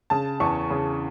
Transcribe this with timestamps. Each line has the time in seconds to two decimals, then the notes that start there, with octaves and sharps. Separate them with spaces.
0.10 C#3 A5
0.40 E2 C#6
0.70 C#3